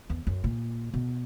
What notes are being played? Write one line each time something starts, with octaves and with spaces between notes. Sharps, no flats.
E2
F#2
A#2
B2